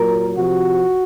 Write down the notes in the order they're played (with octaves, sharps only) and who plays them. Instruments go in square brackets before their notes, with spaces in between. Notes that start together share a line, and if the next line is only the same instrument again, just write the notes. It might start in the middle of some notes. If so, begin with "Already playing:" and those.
Already playing: [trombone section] A#2 F#3 A#4
C3 F3 F#4